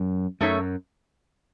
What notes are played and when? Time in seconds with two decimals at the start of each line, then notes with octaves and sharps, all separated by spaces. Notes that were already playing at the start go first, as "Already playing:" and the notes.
Already playing: F#2
0.41 F#2 A3 D#4 A4 C#5 E5